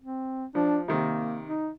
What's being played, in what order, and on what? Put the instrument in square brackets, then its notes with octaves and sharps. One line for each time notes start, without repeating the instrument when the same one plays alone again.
[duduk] C4
[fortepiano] F3 [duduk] D4
[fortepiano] C3 D#3 [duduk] A#3
[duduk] D#4